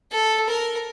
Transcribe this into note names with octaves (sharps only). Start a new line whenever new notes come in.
A4
A#4